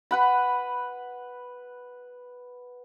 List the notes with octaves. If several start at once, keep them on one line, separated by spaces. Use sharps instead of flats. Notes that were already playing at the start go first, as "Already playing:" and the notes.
B4 F#5 B5